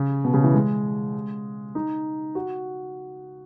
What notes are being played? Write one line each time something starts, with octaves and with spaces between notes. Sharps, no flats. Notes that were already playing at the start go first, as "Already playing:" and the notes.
Already playing: C#3
B2
C#3
E3
G#3
D#4
F#4